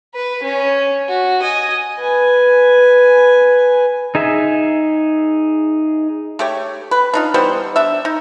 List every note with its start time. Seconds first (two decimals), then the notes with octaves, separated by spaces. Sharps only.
0.14 B4
0.43 C#4
1.09 F#4
1.41 D#5 G#5
1.99 B4 G#5
4.15 D#4 G#4 E5
6.39 A3 G4 C#5
6.91 B4
7.14 D4 D#4 F4
7.34 E3 G3 B3 C5
7.76 D4 E5
8.05 D#4